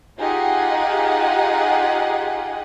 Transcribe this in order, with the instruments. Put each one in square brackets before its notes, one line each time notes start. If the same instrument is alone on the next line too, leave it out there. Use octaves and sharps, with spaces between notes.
[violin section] D#4 F4 G4 G#4 F#5